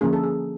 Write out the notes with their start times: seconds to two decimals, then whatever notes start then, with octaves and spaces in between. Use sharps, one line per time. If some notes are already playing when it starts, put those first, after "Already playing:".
0.01 D3 F3 A#3 C#4 G#4
0.13 A4
0.23 G#4